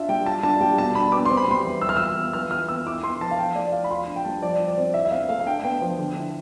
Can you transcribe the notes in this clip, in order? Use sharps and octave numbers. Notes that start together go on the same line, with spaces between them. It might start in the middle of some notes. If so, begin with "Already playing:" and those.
Already playing: D4 F4 E5
G3 G5
F4 A5
D4 A5
G3 G5
B2 A5
D4 B5
B3 D6
C4 C6
B5
G3 C6
E3
E3 E6
F6
E6
F4
B3
E3 F6
F4 F6
B3 E6
E4 D6
B3 C6
F3 A5
F5
E4 G5
A3 D5
F3 F5
B5
F4 C6
D4
G5
G3 A5
F3 D5
F4
D5
C4
E4 E5
E5
C4 F5
A3 F5
F5
D4 G5
B3 G5
F3
D3
E4